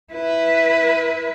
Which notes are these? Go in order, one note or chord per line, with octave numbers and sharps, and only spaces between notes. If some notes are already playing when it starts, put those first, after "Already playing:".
E4 B4